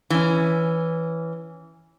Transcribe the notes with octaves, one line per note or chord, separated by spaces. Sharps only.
E3 C#4